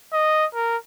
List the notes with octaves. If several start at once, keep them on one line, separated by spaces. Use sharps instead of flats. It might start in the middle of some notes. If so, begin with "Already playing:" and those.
D#5
A#4